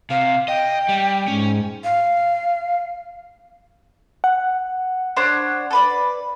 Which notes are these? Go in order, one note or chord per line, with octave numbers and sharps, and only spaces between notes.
C3 F5
D#5 G5
G3
G#2 C#4
F5
F#5
D4 C5 C#5
A4 B4 D5